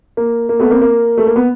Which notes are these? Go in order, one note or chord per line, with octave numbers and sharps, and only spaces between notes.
A#3
A#3
A3 B3
A#3 C4
A#3
A3
A#3
B3